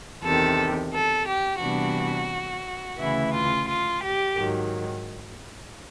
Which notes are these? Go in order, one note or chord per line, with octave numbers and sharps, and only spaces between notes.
E2 C3 D#3 A4
A4
G4
C3 E3 G3 B3 D4 F#4
D2 C#3 E3 E4
F4
F4
G4
G#2 D#3 F#3